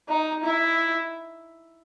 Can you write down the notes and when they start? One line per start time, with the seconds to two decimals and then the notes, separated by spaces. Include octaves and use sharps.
0.08 D#4
0.44 E4